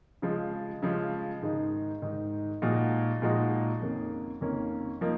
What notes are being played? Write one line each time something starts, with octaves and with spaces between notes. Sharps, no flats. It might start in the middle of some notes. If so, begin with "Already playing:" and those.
C#3 F3 G#3
C#3 F3 G#3
G#2 D#3 G#3 D#4
G#2 D#3 G#3 D#4
A#2 F3 G#3 D#4 F#4
A#2 F3 G#3 D#4 F#4
F2 D#3 A#3 C#4
F2 D#3 A#3 C#4
F3 A#3 D#4